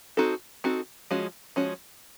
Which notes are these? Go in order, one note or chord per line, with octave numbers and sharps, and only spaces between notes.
C4 D#4 F#4 A4
C4 D#4 F#4 A4
F3 G#3 C#4 F#4
F3 G#3 C#4 F#4